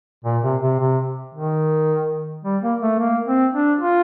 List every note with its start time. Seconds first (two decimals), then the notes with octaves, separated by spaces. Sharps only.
0.24 A#2
0.43 C3
0.62 C3
0.79 C3
1.35 D#3
2.45 G3
2.63 A#3
2.82 A3
2.99 A#3
3.27 C4
3.54 D4
3.81 F4